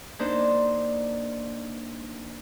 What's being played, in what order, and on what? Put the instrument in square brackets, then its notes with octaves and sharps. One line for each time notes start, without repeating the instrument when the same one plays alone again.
[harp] A#3 D4 D#4 C5